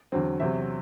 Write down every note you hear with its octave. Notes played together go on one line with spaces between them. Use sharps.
E2 D3 F#3 C4
E2 C3 F#3 C4 E5